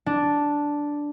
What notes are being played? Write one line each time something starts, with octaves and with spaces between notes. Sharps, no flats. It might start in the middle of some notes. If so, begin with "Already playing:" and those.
D4